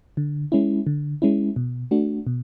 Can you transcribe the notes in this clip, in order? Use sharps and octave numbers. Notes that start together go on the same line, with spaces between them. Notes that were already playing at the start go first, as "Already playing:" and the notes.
D3
G#3 C#4 E4
D3
G#3 C#4 E4
B2
A3 D4 F#4
B2